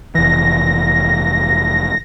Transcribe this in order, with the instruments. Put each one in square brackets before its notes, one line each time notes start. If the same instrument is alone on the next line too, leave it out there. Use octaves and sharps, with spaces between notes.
[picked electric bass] F1 E3 [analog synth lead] A#6